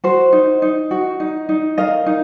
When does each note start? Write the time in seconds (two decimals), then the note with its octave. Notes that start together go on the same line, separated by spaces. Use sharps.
0.04 F#4 C5
0.32 D#4
0.62 D#4
0.91 F#4
1.20 D#4
1.49 D#4
1.78 A#4 D#5 F5
2.06 D#4